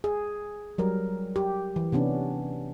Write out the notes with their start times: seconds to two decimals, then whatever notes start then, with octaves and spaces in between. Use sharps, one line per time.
0.04 G#4
0.78 F#3 G3 A#4
1.36 G4
1.76 E3
1.92 C3 B3 C#4 D4